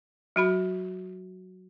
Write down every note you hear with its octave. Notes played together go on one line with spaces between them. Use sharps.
F#3 F#4 B5